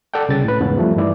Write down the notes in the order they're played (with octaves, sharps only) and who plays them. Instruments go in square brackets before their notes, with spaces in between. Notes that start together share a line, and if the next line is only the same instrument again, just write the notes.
[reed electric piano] A4 D5 F#5 G5
C2 C#3 A6
A2 B4
E2 G#2 C#3 B3
F3 G3 A3
G2 D#3 E3 E4 D5